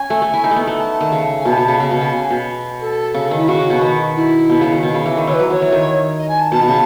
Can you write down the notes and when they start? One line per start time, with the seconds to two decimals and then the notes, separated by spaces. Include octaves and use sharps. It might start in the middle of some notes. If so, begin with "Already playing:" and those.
Already playing: C#4 G#5
0.10 A3
0.22 A3
0.34 E4
0.44 D#4
0.51 A3
0.56 B3
0.67 A3
0.78 A5
1.00 D#3
1.12 C#3
1.40 G#5
1.45 B2 A5
1.57 B2
1.68 C#3
1.80 C#3
1.91 B2
2.01 C#3 A5
2.13 G#5
2.31 B2
2.80 A4
3.14 C#3
3.31 D#3
3.37 E4
3.48 C#3 F#4
3.70 B2
3.81 D#3
4.15 E4
4.50 B2
4.61 C#3
4.72 D#3
4.83 B2
4.94 C#3
5.06 E3
5.17 D#3
5.27 E3 C#5
5.34 B4
5.39 F#3
5.50 F#3 C#5
5.62 E3
5.72 D#3
6.18 D#5
6.28 G#5
6.40 A5
6.52 B2 A5
6.62 B2
6.68 C#3